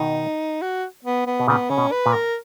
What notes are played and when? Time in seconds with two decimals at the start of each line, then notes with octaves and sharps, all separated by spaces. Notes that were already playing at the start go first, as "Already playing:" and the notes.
Already playing: B2 D#3 D#4
0.62 F#4
1.05 B3
1.26 B3
1.40 B2
1.48 A#2 C#3 B3
1.70 C#3 C#4
1.78 B2
1.92 B4
2.06 A#2
2.13 A#4